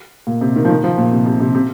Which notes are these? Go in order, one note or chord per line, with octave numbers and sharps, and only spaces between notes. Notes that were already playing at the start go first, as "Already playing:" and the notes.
A#2
C3
D#3
F3
D#3
F3
A#2
C3
C3
C3
C3